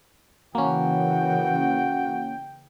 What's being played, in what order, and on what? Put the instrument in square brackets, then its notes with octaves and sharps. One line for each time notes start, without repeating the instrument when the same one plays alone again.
[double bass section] C#3 E3 [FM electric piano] A#3 C#4 [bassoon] F#4 [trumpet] G5